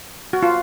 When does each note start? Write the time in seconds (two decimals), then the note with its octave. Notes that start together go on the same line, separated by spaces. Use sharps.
0.33 F#4
0.43 F4